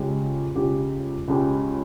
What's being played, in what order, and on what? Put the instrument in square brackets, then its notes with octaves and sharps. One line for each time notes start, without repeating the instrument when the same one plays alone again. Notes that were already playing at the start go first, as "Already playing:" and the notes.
Already playing: [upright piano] C#2 C#3 G#3 C#4 G4
C#2 C#3 G#3 C#4 G4
C#2 C#3 G#3 C#4 G4